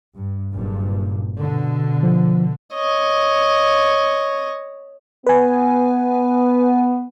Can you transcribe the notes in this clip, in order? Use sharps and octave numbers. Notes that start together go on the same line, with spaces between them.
G2
F#1 G2 A#2
B2 D3
F3
C#5 D#5
B3 B4 G#5